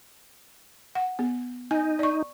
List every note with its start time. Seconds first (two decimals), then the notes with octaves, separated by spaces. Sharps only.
0.95 F#5
1.19 B3
1.71 D#4 G#5
1.99 D5 C#6